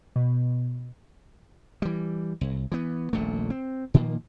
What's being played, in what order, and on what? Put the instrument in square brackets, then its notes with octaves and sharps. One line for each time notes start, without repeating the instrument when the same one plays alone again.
[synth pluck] B2
[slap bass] E3 G3
C2
E3 B3
D#1 A#1 A#2 A3
C4
A#2 D#3 F3 A#3